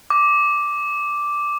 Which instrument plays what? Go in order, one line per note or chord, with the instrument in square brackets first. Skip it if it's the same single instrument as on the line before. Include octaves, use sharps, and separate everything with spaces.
[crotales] D6